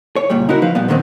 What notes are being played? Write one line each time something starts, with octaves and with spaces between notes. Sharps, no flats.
C#5
C#2 A#2 G3
D#4 E4 F#4 A#4
F3 B4 F5
A#2 G3 B3
A#2 D3 D#3 G3 B3 C4